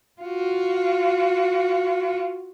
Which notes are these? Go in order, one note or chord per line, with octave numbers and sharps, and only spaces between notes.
F4 F#4